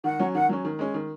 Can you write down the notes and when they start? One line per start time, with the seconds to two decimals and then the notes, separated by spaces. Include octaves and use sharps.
0.04 D#3 F#5
0.19 F#3 C#4
0.35 D#3 F#5
0.49 F#3 C#4
0.65 D#3
0.79 G#3 C#4
0.94 D#3